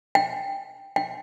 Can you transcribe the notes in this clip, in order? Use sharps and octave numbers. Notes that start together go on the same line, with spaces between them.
G5
G5